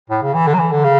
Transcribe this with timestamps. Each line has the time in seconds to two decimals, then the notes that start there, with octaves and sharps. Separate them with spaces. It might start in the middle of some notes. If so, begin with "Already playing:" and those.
0.10 A2
0.22 C#3
0.34 E3
0.47 D3
0.54 F#3
0.59 E3
0.72 D3
0.84 C#3